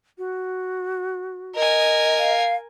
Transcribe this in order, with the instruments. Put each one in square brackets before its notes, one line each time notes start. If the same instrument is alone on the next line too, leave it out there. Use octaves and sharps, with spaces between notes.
[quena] F#4
[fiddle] A#4 G#5 [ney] D#5
[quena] F5